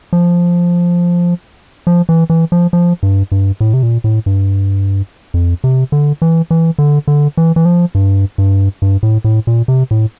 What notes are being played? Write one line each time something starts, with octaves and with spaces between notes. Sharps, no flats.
F3
F3
E3
E3
F3
F3
G2
G2
A2
C3
A#2
A2
G2
F2
C3
D3
E3
E3
D3
D3
E3
E3
F3
G2
G2
G2
A2
A2
A#2
C3
A2